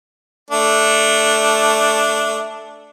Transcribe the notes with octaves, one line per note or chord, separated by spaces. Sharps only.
A3 D4